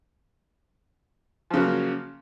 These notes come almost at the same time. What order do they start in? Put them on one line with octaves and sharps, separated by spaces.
F3 C#3 F#3 A#3